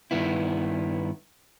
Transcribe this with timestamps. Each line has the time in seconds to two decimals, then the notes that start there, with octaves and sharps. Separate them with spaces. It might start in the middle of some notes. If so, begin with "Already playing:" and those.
0.11 G2 D#3 B3 E4